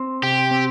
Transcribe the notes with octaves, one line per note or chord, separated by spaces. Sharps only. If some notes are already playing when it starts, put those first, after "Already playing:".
Already playing: C4
C3 G4
C4